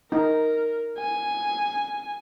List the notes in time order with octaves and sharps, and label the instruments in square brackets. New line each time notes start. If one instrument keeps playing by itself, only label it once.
[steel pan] D#4 [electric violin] A#4
[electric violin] G#5